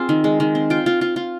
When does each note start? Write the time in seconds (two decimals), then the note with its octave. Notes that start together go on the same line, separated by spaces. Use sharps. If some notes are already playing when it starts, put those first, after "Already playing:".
Already playing: C4 F4 G#4 C5
0.09 D#3
0.24 G#3
0.40 D#3
0.55 C4
0.70 F4 G5
0.86 F4
1.01 F4
1.16 F4